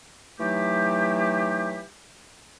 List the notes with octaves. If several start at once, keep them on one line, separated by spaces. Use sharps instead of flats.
E3 F#3 A3 D#4 G4